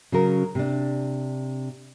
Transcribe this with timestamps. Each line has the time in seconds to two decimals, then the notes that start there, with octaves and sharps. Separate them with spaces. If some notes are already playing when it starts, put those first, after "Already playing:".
0.12 C#3 F#3 C#4 F#4 A#4
0.55 C3 D4